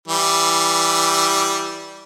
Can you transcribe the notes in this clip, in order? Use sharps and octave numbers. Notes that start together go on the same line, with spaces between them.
E3 G3